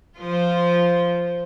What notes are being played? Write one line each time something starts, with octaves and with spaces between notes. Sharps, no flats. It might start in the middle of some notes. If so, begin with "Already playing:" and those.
F3 F4 C5